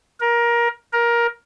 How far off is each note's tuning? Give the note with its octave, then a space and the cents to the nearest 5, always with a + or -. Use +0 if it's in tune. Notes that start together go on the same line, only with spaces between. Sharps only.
A#4 +20
A#4 +15